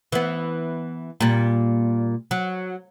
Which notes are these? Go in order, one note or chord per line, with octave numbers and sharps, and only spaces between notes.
E3 B3
A#2 G3
F#3